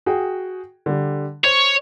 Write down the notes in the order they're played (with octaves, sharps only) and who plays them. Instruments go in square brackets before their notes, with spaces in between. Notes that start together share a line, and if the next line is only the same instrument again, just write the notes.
[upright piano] F#4 G#4 G5
D3 G3
[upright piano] C5 [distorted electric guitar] C#5